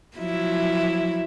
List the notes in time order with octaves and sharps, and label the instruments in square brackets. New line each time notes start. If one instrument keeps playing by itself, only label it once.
[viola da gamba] F3 F#3 E4